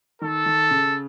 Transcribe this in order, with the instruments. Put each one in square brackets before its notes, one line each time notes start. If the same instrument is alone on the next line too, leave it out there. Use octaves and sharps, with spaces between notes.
[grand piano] D#3 [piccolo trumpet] A4
[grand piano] D#3
C#3